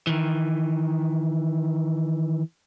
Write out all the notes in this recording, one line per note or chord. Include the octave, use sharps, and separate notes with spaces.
D#3 E3